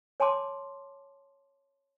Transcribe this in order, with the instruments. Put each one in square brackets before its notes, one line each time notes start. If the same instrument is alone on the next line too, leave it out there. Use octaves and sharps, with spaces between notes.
[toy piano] C#5 G#5 A5 C6 D6